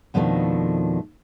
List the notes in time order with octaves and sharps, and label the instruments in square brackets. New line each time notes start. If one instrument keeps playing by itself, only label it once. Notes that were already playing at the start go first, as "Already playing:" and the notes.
[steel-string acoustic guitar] F2 B2 D#3 F3 A3 D4